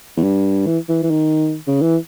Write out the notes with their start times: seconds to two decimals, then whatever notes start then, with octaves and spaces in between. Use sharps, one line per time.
0.17 E2
0.23 G2
0.67 E3
0.89 E3
1.03 E3
1.11 D#3
1.67 C#3
1.81 E3